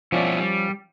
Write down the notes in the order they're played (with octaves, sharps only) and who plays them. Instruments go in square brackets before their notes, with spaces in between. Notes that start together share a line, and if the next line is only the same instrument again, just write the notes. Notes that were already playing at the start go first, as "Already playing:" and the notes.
[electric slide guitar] G2 B2 E4 [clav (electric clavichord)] F3 C#4 D5
[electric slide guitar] G3